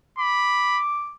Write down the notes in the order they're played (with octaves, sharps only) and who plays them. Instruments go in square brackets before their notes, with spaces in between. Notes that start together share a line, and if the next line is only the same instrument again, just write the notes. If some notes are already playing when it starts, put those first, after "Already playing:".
[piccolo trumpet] B5 [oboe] D6